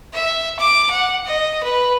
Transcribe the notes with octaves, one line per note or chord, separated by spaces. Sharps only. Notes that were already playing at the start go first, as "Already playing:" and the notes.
E5
D6
F#5
D#5
B4